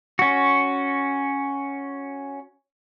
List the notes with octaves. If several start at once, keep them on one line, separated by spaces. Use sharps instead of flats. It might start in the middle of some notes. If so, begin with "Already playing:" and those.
C#4 F#4